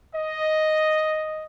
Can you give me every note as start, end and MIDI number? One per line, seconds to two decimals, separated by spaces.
0.15 1.45 75